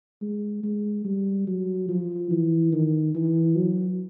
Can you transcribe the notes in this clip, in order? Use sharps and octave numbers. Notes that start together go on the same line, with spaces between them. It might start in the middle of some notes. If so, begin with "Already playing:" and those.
G#3
G#3
G3
F#3
F3
E3
D#3
E3
F#3